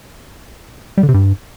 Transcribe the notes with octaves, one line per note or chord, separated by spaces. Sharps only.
G3
D3
C3
G2